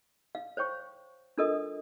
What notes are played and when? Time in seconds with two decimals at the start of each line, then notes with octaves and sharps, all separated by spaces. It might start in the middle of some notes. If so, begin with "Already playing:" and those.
0.35 F5
0.57 C5 C#5 G5 C#6
1.38 D4 F4 A4 A#4 D#5 D#6